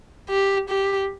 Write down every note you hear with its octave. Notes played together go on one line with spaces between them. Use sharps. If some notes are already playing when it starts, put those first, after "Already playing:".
G4
G4